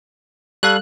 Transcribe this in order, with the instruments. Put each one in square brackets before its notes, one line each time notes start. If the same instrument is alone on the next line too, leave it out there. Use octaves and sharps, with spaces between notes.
[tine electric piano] G3 A4 F5 [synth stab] F#6